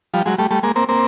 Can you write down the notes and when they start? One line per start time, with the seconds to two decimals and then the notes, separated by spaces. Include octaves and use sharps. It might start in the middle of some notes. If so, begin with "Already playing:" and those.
0.14 F3 G3
0.26 F#3 G#3
0.38 G3 A3
0.50 G3 A3
0.63 G#3 A#3
0.76 A#3 C4
0.89 A#3 C4